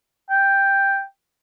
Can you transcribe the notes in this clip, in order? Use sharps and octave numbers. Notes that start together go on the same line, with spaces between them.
G5